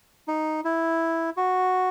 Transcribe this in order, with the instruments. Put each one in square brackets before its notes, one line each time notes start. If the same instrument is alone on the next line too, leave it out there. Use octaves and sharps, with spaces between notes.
[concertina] D#4
E4
F#4